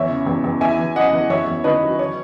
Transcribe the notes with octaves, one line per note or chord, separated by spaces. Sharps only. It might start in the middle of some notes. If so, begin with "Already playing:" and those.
Already playing: E2 C#5 E5
C#3
E2
E2
E3 E5 G#5
E3
F#2 D#5 F#5
E3
E2 C#5 E5
E2
D#3 B4 D#5
F#3
C#5